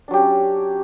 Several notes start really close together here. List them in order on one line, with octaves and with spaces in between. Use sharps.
D4 F#3 G4 C#4